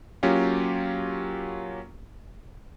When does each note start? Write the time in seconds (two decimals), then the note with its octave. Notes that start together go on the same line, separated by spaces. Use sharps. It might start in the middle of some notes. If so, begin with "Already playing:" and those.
0.23 F#3 A#3 C#4 F4 G4